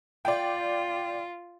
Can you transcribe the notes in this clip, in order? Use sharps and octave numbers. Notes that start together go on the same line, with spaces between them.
F4 D5 G5